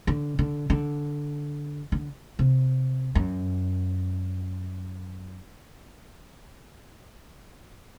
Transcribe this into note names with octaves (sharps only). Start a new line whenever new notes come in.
D3
D3
D3
D3
C3
F#2